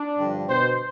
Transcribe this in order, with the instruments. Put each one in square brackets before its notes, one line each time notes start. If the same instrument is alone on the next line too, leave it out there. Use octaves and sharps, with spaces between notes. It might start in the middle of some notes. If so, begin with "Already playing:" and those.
Already playing: [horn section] D4
G2 D3 F3
B2 C5